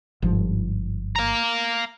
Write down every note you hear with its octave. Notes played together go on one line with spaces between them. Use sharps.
G1 G#2 F3
F5 A#5